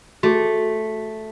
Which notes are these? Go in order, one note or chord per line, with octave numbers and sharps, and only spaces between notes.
A3 F#4 G#4